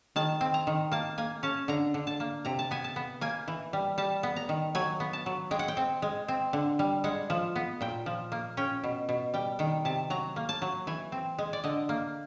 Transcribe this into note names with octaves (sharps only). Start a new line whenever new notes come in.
D#3 A5
C4
A#5
D#3
A#3 A5
A#3 G#5
C#4 A5
D3 A#5
D3
A5
A#3
C3 A#5
A5
B3 G#5
A5
B3
A#3 G#5
E3
G3
G3 A5
B3
A#5
D#3
F#3 G#5
B3
A5
F#3
G#3 G5
F#5
G5
C4
G#3
C4
D3
G3
G#3 F#5
F3
B3
A#2 G5
F3
A#3
C#4 G5
B2
B2
G3 G5
D#3 G5
C3 A5
F#3 A#5
A#3
A5
F#3
E3 G#5
C4
G#3
D5
D3 D#5
A#3